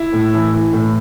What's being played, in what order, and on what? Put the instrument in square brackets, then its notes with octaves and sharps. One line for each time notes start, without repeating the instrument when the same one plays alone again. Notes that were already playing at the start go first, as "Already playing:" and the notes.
Already playing: [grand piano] E4
A2
E3
E3
A2